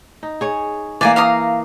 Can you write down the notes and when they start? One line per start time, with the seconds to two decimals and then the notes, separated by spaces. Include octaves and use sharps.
0.23 D#4
0.41 G#4 C#5
1.01 E3 A#3 D5 G#5
1.16 F5 A#5 D#6